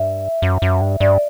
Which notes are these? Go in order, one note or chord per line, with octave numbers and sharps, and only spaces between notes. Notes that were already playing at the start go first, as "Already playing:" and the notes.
Already playing: G2 E5
F#2
F#2
G2
G2 D5